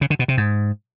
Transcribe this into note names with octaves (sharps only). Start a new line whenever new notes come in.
C#3
D3
B2
C3
G#2